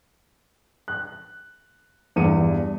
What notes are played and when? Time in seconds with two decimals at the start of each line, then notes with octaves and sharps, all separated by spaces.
0.88 F#6
2.16 E2 G2 C#7 D#7